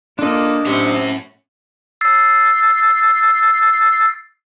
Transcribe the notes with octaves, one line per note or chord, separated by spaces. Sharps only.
A#3 D4 F4 A4 D#5
A2 C3 C#4 F#4
E6 A6 C7